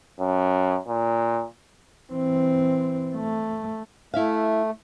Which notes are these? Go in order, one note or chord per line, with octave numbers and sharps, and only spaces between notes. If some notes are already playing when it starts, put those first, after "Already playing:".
F#2
A#2
E3 C4
A3
A3 E4 E5 F5